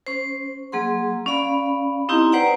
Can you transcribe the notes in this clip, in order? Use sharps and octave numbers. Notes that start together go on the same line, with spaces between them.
C#4 C5
F#3 A#3 G#4 F#5 C6
C#4 D5 F5 B5
C4 D#4 E4 G4 D#5 A#5
B4 C5 D5 F#5 G5 A#5